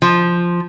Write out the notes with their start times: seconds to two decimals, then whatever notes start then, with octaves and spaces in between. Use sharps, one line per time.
0.02 F3